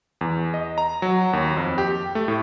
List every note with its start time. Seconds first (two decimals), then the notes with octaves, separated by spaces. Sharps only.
0.21 E2
0.54 D#5
0.78 A#5
1.02 F#3
1.33 D#2
1.57 F2
1.78 G4
2.15 A3
2.28 A2